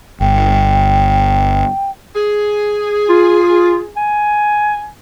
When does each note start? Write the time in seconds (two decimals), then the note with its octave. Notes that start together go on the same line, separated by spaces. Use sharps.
0.21 G1 G5
2.16 G#4
3.09 F4
3.96 G#5